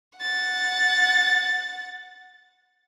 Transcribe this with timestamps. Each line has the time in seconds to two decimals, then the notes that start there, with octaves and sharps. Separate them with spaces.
0.18 F#5 A6